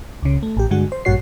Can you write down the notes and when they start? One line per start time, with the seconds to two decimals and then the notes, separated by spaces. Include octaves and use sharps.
0.23 C#2 C#3
0.43 A3
0.57 A1 G4
0.71 G2 D3 G#3 F#4
0.92 C5
1.05 A1 G2 A#2 F#4 C#5 C7